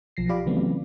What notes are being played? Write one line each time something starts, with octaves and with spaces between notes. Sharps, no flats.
B1 F3 A#6 C7
F4 G4 D5 F5 B5 D6
C#3 E3 F#3 A3 B3 C4